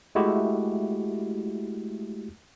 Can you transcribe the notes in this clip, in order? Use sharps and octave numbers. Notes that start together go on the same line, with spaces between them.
G#3 A3 E4 F#4 G4